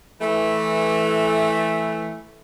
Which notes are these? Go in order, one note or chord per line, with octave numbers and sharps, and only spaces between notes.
E3 A3